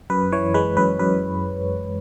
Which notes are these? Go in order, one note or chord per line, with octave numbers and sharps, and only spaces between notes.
F#2 B4
E3 C#5
G#3 B4
F#2 B4
F#2 B4